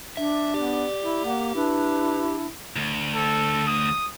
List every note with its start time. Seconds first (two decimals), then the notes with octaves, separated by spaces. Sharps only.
0.17 D4 E5
0.54 B3 G4 D5
1.02 E4
1.25 A#3 F#5
1.55 D4 E4 B4
2.76 D2
3.15 A4
3.67 D#6